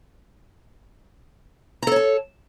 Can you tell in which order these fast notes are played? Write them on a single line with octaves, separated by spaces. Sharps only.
A#5 A4 C#5 A5